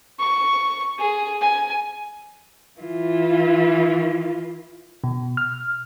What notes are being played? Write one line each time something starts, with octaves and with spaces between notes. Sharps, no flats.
C#6
G#4
G#5
E3 F4
B2
F6